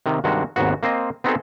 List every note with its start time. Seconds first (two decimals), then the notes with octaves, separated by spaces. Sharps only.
0.06 C3 D#3
0.24 G2 C3 D#3 G#3 F#4
0.56 G#1 D#2 G#2 B3 F#4
0.83 A#3 C4 C5 D#5
1.24 B3 C4 D#4 F#4 G#4 A4